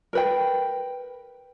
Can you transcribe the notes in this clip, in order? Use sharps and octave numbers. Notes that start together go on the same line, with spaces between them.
A#4 B4 G5